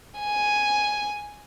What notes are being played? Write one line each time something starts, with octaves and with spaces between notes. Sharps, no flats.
G#5